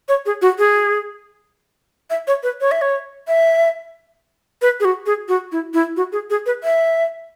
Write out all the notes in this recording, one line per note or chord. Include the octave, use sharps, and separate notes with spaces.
C#5
G#4
F#4
G#4
E5
C#5
B4
C#5
E5
C#5
E5
B4
G#4
F#4
G#4
F#4
E4
E4
F#4
G#4
G#4
B4
E5